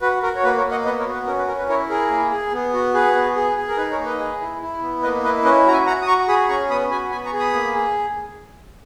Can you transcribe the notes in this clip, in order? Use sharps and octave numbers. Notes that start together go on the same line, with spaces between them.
F#4 B4
F#4 A#4
C#5
A#3 B4
A#4 C#5
A#3
D#5 F#5
B3 B4 D#5
A#4 C#5
F#4
B4
C#4 A#4
B4
C#4 A#4
B4
E4 A#4 C#5
G#4 A#4
A#3
G#4
B3
F#4
G#4 B4
B3
G#4
G#4
A#4
D#4 B4
A#4 C#5
A#3
B4 D#5
G#4
E4
E4
B3
A#3 B4 D#5
E4 B4 D#5
C#4 B4 D#5
F#4 A#5
E5 G#5
F#4 F#5 A#5
D#6
F#4 A#5 C#6
G#4 B5 D#6
C#4 A#5 C#6
B3 B5 D#6
F#4 G#5 B5
B3 G#5 B5
A#5 C#6
G#4
B5 D#6
A#3
G#4